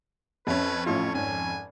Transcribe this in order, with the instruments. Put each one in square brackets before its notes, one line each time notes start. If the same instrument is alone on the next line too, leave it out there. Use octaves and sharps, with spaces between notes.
[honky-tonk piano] F2 C#4 [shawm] B4 [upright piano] E5
[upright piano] A1 A3 F4 [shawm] C#5
[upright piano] G#1 [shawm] G#5